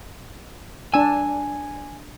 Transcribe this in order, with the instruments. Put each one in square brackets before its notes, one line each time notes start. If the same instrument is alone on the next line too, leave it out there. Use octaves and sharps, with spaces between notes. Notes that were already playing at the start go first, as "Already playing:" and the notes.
[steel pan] D4 E6 [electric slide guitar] G#5